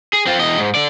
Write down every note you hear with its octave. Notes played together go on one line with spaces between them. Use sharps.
G#4
C4 F4
E2 D#5
G#2
D3 D5